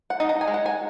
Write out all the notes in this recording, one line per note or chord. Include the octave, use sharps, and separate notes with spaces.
F#5
D#4
A#5
G#5
G#3
F#5
G#5